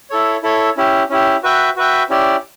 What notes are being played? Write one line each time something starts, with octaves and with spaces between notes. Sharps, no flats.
E4 A4 C#5
E4 A4 C#5
C#4 E4 G4
C#4 E4 G4
F#4 B4 E5 G5
F#4 B4 E5 G5
C#4 E4 G4 D5